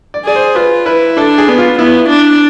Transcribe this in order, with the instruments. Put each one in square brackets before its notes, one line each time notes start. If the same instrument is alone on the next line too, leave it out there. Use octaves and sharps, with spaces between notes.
[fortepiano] D5
[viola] G#4 [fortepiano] D5
[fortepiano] C5
[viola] F4 [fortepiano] B4
[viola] E4 [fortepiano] B4
[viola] D4 [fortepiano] A4
[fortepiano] G#4
[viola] B3
[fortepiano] F4
[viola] B3 [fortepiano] E4
[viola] D4